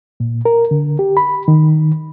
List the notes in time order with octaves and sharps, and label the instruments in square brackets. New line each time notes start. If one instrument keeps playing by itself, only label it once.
[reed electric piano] A#2
A#4
D3
G4
B5
D#3